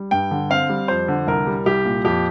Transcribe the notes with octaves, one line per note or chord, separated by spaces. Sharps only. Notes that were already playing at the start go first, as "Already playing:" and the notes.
Already playing: G3
G2 G5
D3
C4 F5
G3
F2 C5
D3
C2 A#4
G3
C2 G4
A#2
F2 G4